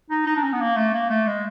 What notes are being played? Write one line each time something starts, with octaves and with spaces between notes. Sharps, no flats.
D#4
D#4
D4
C#4
B3
A#3
A3
A#3
A3
G#3